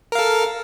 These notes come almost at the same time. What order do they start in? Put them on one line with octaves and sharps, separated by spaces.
A#4 F5 A4